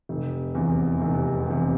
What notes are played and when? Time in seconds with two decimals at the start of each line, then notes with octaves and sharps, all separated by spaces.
0.09 F1
0.55 E2 C3
1.02 F1
1.47 E2 C3